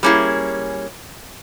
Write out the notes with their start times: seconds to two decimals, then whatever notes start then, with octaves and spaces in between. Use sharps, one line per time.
0.03 G3 A#3 C#4 E4 G#4